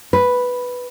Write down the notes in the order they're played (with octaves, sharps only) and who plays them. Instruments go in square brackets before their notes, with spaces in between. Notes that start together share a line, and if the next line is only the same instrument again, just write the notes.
[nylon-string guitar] B4